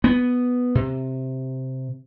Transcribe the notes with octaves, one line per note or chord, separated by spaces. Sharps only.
B3
C3